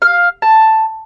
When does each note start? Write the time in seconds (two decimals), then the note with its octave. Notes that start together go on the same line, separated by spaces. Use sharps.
0.02 F5
0.42 A5